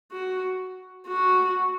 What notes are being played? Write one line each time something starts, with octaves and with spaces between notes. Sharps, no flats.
F#4
F#4